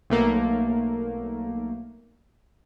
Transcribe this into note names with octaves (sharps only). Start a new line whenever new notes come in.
B1 A3 A#3